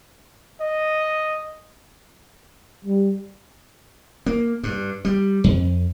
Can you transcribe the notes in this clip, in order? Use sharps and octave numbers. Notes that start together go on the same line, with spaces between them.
D#5
G3
A#3
G2
G3
F2